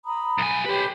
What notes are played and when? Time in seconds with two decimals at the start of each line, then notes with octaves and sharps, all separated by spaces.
0.06 A#5 B5 D#6
0.38 B1 G#5
0.66 G4 B4 C#5 B5